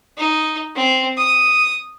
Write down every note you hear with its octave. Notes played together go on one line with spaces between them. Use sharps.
D#4
C4
D#6